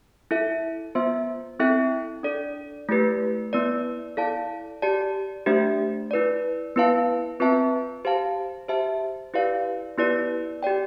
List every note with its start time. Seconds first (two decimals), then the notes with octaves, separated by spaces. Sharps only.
0.31 E4 A4 E5
0.95 B3 F4 C5 E5
1.59 C4 E4 A4 E5 G5
2.23 D4 A4 D5
2.89 A3 E4 G4 B4
3.53 B3 E4 B4 D5
4.17 E4 A4 D5 F5 A5
4.82 G4 D5 A5
5.46 A3 D4 G4 C5 E5
6.11 E4 B4 D5
6.76 B3 E4 B4 F5 A5
7.40 C4 F4 B4 E5 A5
8.05 G4 C5 F5 A5
8.68 G4 C5 E5 A5
9.34 E4 G4 B4 D5 F5
9.98 B3 E4 G4 B4 D5
10.63 G4 D5 G5